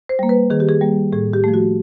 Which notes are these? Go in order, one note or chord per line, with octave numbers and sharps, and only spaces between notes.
C5
G3 A#3
B4
D#3 G#4
G4
G#4
G3 A#3
A2 G#4
G4
F3 A3
F#4